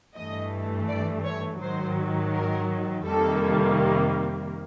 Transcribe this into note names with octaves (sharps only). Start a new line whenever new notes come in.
G2 E3 A3 D#5
D5
C#5
G#2 D#3 F#3 C5
A#4
F2 C3 D#3 G3 A#3 A4